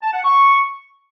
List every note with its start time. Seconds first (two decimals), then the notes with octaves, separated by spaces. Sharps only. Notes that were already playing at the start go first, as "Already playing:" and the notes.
0.02 A5
0.13 F#5
0.24 C#6